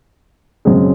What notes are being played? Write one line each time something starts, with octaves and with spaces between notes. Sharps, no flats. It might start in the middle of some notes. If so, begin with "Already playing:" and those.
F#2 C#3 G#3 C4